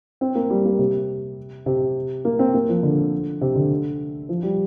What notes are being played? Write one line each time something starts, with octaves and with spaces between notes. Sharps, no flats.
C4
A#3
G3
A#3
C3
C3
A#3
C4
A#3
F3
D3
C3
D3
F3
G3